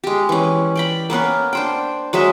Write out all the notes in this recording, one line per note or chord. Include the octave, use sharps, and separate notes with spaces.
G#3 G4
E3 C#4
D5 G5 B5
A#3 B3 C#4 B4
D4 C5 G5
F#3 G#3 D#5 E5